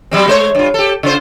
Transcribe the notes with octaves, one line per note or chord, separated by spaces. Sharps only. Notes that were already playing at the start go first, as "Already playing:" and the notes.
F#3 G3 C4
G#3 C5 C#5
G2 F4
G4 A4
C#3 F4 C5